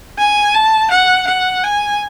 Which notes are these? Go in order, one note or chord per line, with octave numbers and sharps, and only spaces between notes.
G#5
A5
F#5
F#5
G#5